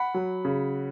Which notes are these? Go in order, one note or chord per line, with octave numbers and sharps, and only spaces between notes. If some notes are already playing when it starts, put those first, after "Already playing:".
Already playing: F#5 B5
F#3
C#3